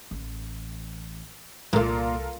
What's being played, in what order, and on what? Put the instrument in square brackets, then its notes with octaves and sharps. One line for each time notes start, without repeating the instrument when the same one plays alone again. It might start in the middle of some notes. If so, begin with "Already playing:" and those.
[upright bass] A1
[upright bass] C2 [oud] A#2 [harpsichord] E3 A3 [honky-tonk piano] F4 A4 A#4